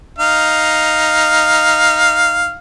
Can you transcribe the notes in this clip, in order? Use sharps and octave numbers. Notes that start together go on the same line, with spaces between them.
D#4 F5